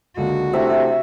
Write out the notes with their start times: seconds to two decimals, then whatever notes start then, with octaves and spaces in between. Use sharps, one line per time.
0.17 C#2 D3 A#3 F#4
0.53 C3 A3 D4 E4 E5